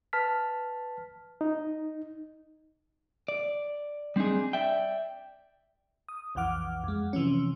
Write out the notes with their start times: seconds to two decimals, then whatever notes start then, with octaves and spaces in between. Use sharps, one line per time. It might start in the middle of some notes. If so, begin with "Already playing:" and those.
0.13 B4 A5 F6 B6
1.41 D#4
3.28 D5
4.16 G3 C4 D4 D#4 G#4
4.53 D5 E5 G5
6.09 D#6
6.35 B1 F2 E3 F#5 D6 F6
6.84 F2 G#3
7.13 C3 E3 F3 C#4